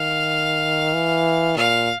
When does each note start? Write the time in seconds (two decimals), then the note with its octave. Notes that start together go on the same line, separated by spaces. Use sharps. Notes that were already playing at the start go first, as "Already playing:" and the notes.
Already playing: D#3 F5
0.94 E3
1.56 A#2 F5